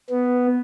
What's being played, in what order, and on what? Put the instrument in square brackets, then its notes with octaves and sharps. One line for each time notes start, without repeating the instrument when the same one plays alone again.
[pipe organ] B3